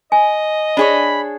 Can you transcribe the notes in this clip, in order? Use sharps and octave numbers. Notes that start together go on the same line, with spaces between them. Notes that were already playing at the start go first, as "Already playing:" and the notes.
D#5 G#5
D4 G#4 C#5 B5